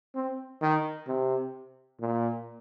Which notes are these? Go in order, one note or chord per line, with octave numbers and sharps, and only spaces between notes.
C4
D#3
C3
A#2